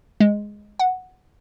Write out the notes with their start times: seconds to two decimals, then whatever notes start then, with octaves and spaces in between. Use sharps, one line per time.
0.20 G#3
0.79 F#5